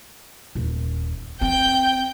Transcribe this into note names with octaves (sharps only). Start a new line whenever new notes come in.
D#1 D#2
C4 G5 G6